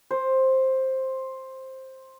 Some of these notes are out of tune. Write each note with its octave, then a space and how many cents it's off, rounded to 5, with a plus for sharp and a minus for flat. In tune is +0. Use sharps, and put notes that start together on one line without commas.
C5 +10